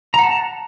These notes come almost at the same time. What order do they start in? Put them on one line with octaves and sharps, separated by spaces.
A#5 F#5 A5